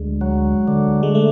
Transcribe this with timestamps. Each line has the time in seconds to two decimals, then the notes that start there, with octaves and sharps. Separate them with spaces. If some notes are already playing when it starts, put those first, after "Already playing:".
Already playing: D2 G#3
0.21 F#3
0.68 D3
1.03 G#3
1.15 A3